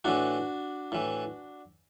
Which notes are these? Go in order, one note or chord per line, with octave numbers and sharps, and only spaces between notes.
A2 E3 D4 F#4
A2 E3